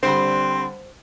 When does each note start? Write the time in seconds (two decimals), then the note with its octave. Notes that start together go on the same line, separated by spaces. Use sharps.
0.03 D3 G3 C4 C5 B5